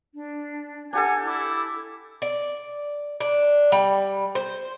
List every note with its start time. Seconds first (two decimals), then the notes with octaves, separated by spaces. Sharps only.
0.15 D4
0.93 D4 G4 A4 F#5 G#5
1.25 E4 D6
2.22 D5
3.20 D4
3.72 G3
4.35 C5